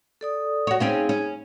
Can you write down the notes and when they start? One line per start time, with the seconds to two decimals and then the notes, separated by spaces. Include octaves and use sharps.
0.21 A4 D5 D#6
0.67 F#4 C#5
0.80 C4 C#4 D#4 F4 G#4
1.09 C#4